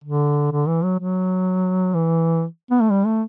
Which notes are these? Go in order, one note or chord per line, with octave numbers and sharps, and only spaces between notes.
D3
D3
E3
F#3
F#3
E3
B3
A3
G3
A3